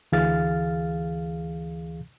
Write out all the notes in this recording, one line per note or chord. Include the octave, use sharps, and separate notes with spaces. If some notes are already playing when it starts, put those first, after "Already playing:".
D2 E3 G#4 F5 F6 A6